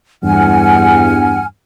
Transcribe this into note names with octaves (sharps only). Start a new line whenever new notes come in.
E2 G2 F#5 G#5 F6